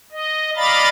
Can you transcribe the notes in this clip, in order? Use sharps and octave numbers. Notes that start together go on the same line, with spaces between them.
D#5
D5 D#5 F5 A#5 B5 A6